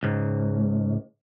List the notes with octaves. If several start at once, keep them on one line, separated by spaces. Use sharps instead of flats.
C#2 G#2